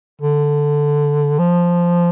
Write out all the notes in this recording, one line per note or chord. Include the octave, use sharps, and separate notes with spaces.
D3
F3